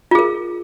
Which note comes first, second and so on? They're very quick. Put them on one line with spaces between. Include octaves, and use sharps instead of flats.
F4 G#4 A#4